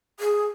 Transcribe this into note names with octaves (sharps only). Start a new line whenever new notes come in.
G#4